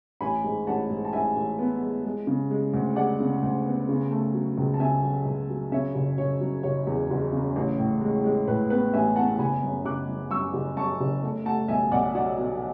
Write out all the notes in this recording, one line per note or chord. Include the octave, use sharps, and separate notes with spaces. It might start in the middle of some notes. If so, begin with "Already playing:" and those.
A1 G#5 B5
G#2
A1 F#5 A5
G#2
A5
A1 E5 G#5
A1
B3
G#3
G#3
C#3
G#3
D2
G#3 D5 F#5
C#3
D2
B3
C#3
A3
F#3
C#2
A5
C#3 E5 G#5
F#3
C#2
F#3
C#3 C#5 E5
F#1
F#1 C#5
F#3
F#1 C#5
E2
F#1
C#3
A1
A2
G#3
G#3
A2 B4
B3 B4
A1 E5 G#5
B3 F#5 A5
F#1 G#5 B5
F#2
F#1 D6 F#6
F#2
F#2 C#6 E6
F#1
F#2 A5 C#6
F#1
A3
A3 F#5 A5
B1 E5 G#5
B1 D5 F#5
F#3 D5 F#5
B2